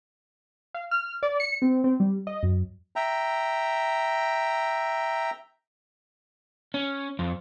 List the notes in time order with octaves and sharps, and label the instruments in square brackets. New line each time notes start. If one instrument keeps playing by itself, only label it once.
[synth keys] F5
F6
D5
C#7
C4
C4
G3
D#5
F#2
[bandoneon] E5 G5 A#5
[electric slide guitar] C#4
F2